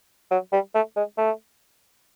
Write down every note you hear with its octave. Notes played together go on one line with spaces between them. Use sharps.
F#3
G3
A3
G#3
A3